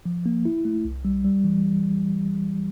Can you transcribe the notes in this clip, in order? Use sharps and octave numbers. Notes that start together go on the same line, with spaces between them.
F3
A#3
E4
A3
C2
G3
G3
E3